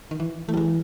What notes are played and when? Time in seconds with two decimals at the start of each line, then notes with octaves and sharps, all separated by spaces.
0.11 D#3
0.20 E3
0.48 E3 A3
0.54 G3
0.57 G#3